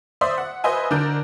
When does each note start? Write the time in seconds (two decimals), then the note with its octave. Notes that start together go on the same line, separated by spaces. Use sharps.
0.21 C5 D5 E5 C6 D#6
0.38 F#5
0.64 B4 C5 D#5 E5 G#5
0.91 D3 D4 A#4 G6 D7